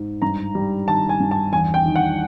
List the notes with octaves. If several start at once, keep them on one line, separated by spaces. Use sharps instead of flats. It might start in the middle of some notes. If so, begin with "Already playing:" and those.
Already playing: G#2
G2 A#5
G3
D#3 A5
G#5
G2
A5
E2 G#5
G5
D#3
F#5